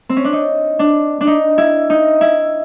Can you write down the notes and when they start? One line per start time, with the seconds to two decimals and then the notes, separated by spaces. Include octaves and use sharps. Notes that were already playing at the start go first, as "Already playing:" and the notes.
0.09 C4
0.16 C#4
0.25 D4
0.33 D#4
0.79 D4
1.21 D4
1.27 D#4
1.58 E4
1.90 D#4
2.21 E4